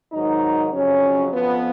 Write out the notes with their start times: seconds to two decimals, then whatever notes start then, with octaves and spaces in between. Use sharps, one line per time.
0.12 G#2 D#3 F#3 D#4
0.72 F2 C#3 F#3 C#4
1.31 F2 F3 B3